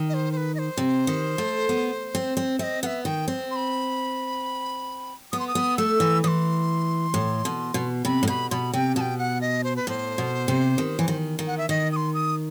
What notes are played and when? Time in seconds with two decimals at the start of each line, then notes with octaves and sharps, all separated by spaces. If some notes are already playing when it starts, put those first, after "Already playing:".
Already playing: D#3
0.09 D#5
0.14 C5
0.32 C5
0.37 B4
0.55 D#5
0.59 C5
0.77 C3
1.07 D#3
1.38 A3
1.69 B3
2.15 C4
2.37 C4
2.59 C4 D#5 E5
2.83 B3 E5 F#5
3.05 D#3 G5
3.28 C4
3.51 C6
3.56 B5
5.32 B3 D#6
5.39 C6
5.48 D#6
5.55 B3
5.78 A3 E6
6.00 E3
6.24 E3 C6 D#6
7.14 A2
7.45 B2
7.74 B2
8.05 C3 B5
8.23 A2
8.28 B2 B5
8.51 B2 B5 C6
8.73 C3 G5
8.96 B2 A5
9.01 G5
9.18 F#5
9.41 D#5
9.64 C5
9.76 B4
9.87 A2 C5
10.18 B2
10.48 C3
10.78 D#3
10.99 E3
11.08 D#3
11.39 D#3
11.47 F#5
11.58 E5
11.69 D#3 D#5
11.92 D#6
11.96 C6
12.14 D#6